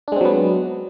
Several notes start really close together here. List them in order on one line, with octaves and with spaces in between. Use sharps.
D4 G#3 C4 F#3 B3